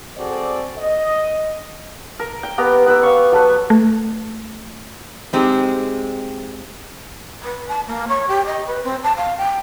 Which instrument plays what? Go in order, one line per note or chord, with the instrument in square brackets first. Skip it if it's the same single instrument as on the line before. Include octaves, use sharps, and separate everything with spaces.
[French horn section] C4 F#4 G#4 A4 C5 D5
D#5
[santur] A#4
G5
B3 G4 A#4 A#5
B3 B4 E6
F5 C#6
F#3 A4 B4
[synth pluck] A3
[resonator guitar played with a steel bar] G#3 C4 D#4 G4 G#4
[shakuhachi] B4
A5
A#3
C#5
G4
D#5
B4
C4
A5
F5
G5